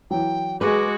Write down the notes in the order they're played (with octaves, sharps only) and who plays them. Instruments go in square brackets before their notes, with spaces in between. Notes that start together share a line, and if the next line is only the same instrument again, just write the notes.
[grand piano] E3 F#3 [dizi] G5
[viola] G#3 F#4 [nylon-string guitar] G#4 B4 [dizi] D6